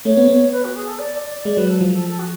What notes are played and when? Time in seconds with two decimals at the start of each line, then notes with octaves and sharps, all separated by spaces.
0.05 A3 C#5
0.17 B3
0.28 B3
0.52 B4
0.64 F#4
0.75 G#4
0.87 A4
0.98 D5
1.14 D5
1.30 D5
1.45 G#3 D5
1.57 F#3 B4
1.69 A4
1.81 F3
1.92 A4
2.08 A4
2.19 F#4